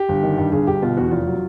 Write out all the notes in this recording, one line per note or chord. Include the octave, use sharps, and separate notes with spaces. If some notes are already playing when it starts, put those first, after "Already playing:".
Already playing: G4
G1
D#3
G2
G1 G#4
G1 G4
B2 F4
E2 F#4
F1 F4
F#3